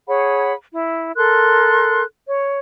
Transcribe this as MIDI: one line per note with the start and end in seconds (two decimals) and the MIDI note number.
0.07 0.52 68
0.07 0.52 73
0.07 0.52 78
0.07 0.52 83
0.71 1.12 64
1.15 2.03 69
1.15 2.03 70
1.15 2.03 84
1.15 2.03 90
2.27 2.58 73